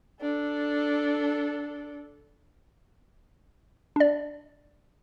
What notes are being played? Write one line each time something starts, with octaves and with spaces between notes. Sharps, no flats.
D4 A4
D4 D5